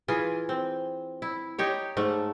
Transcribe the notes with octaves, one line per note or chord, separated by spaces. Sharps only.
E3 F4 G#4
C4
E4
D#4 G4 C#5
G#2 A3